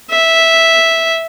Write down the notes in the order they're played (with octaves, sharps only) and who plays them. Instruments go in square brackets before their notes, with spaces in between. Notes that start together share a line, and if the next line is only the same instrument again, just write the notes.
[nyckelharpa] E5